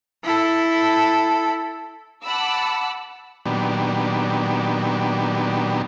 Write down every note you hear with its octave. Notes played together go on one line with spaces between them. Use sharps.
E4 A4
F#5 A5 B5 D6 E6
A#2 D#3 F#3 B3 D4 G4